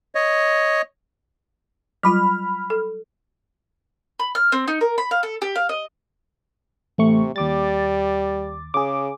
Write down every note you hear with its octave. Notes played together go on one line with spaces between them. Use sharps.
C#5 D#5
F#3 G3 F4 B5 F6
A4
B5
F6
C4
D#4
A#4
B5
F5
A4
G4
F5
D#5
A1 C3 A3 C#6
D#2 G3 D6 A6
C#3 G#4 D6